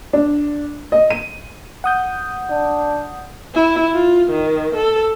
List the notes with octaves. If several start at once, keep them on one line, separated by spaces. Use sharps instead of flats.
D4
D#5
D#7
F#5 D#6 G6
D4
E4
F4
D#3
A4